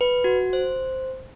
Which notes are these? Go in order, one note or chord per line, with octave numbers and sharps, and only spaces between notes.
B4
F#4
C5